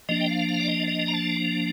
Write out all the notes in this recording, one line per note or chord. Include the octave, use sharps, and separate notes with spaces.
F3 A#3 D4 D#5
G5
F5
F5
D5
D#5
D#5
A#5
A5